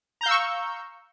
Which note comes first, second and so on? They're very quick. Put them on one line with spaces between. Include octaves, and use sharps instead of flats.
A#5 G6 F5 E6 C#6